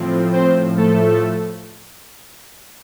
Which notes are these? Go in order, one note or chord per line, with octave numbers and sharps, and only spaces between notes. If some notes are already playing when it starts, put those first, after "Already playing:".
Already playing: A2 F3 C4
C4 C5
A3 A4